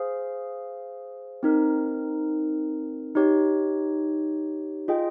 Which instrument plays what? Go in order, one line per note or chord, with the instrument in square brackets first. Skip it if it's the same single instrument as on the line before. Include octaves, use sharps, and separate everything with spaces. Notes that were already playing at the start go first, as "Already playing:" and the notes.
Already playing: [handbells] G#4 C5 F5
C4 D#4 A#4
D#4 G4 C#5
F4 G#4 D#5 G5